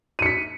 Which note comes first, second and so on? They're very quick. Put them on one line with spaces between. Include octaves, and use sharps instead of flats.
D#7 C#7 B6